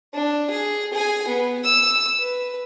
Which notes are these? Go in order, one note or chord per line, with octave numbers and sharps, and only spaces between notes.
D4
G#4
G#4 G#5
B3
E6
B4